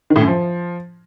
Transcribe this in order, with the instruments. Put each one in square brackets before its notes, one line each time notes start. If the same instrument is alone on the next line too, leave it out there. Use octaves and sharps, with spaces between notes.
[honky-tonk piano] D#3
A2
F#2
F3